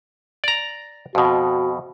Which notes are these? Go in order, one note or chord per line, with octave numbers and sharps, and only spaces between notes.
D5 A#5
F2 B2 F#4